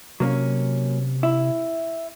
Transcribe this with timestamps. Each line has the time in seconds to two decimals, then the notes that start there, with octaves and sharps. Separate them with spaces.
0.20 C3 F#3 A#3 C#4
1.23 E4